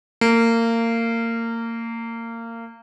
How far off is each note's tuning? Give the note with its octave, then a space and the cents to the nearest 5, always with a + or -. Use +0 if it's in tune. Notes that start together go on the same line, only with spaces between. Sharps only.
A#3 -25